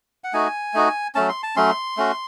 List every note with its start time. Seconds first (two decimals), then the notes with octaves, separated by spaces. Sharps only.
0.24 F#5
0.33 A3 D#4 F#4 G#5
0.74 A3 D#4 F#4
1.15 F#3 A3 C#4 A5
1.29 C6
1.43 A5
1.56 F#3 A3 C#4 C6
1.97 A3 C#4 F#4